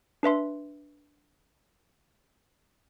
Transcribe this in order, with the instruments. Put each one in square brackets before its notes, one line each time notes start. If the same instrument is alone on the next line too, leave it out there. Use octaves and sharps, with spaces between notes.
[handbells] D4 B4 E5 C6